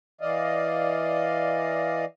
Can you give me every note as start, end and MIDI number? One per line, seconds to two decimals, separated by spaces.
0.21 2.05 52
0.21 2.05 74
0.21 2.05 75
0.21 2.05 77